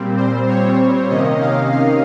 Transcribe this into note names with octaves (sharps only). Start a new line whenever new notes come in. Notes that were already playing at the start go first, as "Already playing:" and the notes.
Already playing: A#2 G3 C4
C5
C#5
C3 D#3 A#3 C#4 D#5
F5
F5